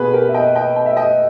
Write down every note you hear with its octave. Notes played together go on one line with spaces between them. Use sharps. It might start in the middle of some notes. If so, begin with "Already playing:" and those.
Already playing: B2 G#4 B4
G4 A#4
E5
D#5 G5
D#5 G5
G5
E5
D#5 G5